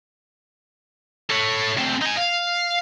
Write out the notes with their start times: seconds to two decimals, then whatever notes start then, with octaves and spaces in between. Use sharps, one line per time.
1.30 A4 C#5
1.77 D2 C4
2.02 D#4 G#5
2.17 F5